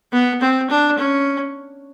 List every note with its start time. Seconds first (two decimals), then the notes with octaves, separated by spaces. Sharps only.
0.13 B3
0.41 C4
0.70 D4
0.98 C#4